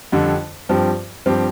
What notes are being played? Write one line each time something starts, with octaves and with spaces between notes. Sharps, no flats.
F2 D3 G3
G2 F3 C4 G4
G2 F3 C4 G4